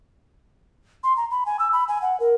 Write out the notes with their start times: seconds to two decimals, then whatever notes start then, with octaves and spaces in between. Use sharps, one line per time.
1.04 C6
1.17 A#5
1.31 B5
1.46 G#5
1.59 E6
1.73 B5
1.88 G#5
2.02 F#5
2.20 A#4